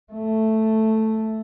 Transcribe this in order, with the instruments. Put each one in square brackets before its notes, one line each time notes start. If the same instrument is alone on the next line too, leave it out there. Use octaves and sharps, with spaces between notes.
[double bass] A3